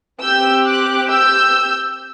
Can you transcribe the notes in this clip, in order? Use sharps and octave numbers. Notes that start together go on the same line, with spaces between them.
C4 G4 E6 G6
D6 F#6
E6 G6